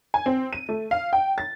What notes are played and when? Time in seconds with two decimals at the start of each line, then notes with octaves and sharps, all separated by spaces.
0.14 G#5
0.26 C4
0.53 D#7
0.69 A3
0.91 F5
1.13 G5
1.38 A6